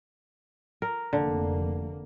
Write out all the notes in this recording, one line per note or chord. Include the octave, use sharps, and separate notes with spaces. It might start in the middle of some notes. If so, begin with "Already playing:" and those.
A#4
F1 D3 A#3